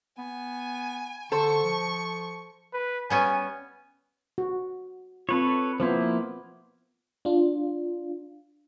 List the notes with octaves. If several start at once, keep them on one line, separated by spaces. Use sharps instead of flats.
B3 G#5
D3 A4 C5 C#6
F3
B4
G3 B3 C#4 G#5
F#4
C4 F4 A4 B4 C#5
F3 A#3 B3 E4 F4 C5
D4 F4